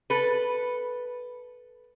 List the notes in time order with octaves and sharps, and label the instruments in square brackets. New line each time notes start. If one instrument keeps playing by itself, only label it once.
[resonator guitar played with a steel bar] A4 B4